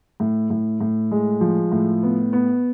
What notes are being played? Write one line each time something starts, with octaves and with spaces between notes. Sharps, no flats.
A2
A2
A2
G#3
F3
A2
B3
B3